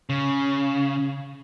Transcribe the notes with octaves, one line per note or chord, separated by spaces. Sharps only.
C#3